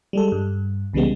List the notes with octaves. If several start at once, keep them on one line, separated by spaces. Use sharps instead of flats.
G3 G#3 A4
G2
C2 C#3 E3 G3 G#3 B3